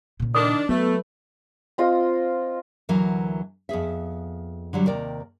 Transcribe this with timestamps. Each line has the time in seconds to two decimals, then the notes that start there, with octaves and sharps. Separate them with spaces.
0.20 A#2 C#3
0.35 D#3 D4 D#6
0.69 F#3 G#3 A3 B3 B4
1.78 C4 F4 D#5 D#6
2.89 D2 E3 F#3 A#4
3.69 F2 B3 G#4 E5
4.73 D3 F#3 G3
4.86 D#2 C3 A#4 D5